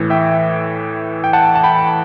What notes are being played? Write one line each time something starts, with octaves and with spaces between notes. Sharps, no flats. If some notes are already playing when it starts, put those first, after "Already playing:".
Already playing: A2 E3
E5 G5
G5
F#5 A5
A5
G5 B5